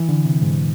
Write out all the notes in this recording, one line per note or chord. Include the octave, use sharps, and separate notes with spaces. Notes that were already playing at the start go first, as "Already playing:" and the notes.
Already playing: E3
D3
C3
G#2